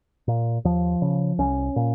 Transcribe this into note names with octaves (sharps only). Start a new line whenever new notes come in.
A#2
D#2 F3
C#3
C2 C#4
A#2